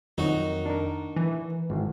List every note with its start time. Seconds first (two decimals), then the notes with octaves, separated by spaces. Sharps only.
0.18 F2 D#3 F#3 D#4 F#4
0.66 D4 A#4
1.16 E3
1.70 G#1